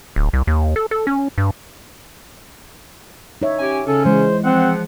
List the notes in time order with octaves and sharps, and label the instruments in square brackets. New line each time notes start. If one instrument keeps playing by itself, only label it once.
[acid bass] D1
C2
D#2
A4
A4
C#4
G2
[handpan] D#4 C#5 E5
[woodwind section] C#4 G4 G#5
[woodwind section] C#3 C#4 [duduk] A4
[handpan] E3 G#3 [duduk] C5
[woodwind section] F3 F#5 [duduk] C4